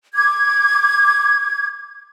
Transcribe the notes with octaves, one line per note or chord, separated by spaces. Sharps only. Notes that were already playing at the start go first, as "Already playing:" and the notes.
D6 G#6